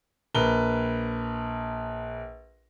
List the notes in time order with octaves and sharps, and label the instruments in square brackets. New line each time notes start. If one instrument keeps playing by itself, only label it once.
[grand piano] A#1 A#4 B4 G7